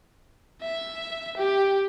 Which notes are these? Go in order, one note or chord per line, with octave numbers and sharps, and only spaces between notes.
E5
G4